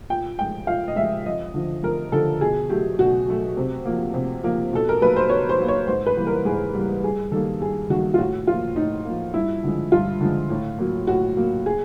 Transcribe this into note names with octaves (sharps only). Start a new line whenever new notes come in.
A#2 G5
F3 G#3 G5
A#2 F5
D#5
F3 G#3 E5
F2 D#5
D3 F3
F2 A#4
D3 F3 A4
B2 G#4
F#3 A3 G4
B2 F#4
F#3 A3
C3
F3 A#3
C3
F3 A#3
B2 A4
A#4
F#3 A#3 B4
C5
B2 C#5
C5
F#3 A#3
C#5
G#2 C5
B4
E3 G3 A#3
A#4
G#2 G#4
E3 G3 A#3
G2 G#4
D#3 G3 A#3 A4
G2 G#4
D#3 G3 A#3 F#4
F4
A2 F#4
F3 A#3 F4
A2 D#4
F3 A#3
G2 E4
D3 F3 G#3
G2 F4
D3 F3 G#3
A2
F#3 A#3
A2 F#4
F#3 A#3
G#4